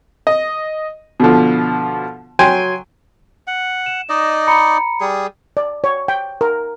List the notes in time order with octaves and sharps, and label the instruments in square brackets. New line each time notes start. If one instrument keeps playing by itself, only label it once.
[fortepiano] D#5
B2 D3 F3
F#3 G5 G#5 C6
[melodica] F#5
[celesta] E7
[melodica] D#4 D5 D#5
[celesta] A#5 B5 C#7
[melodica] G3 G#4
[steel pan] D5
C#5
G5
A#4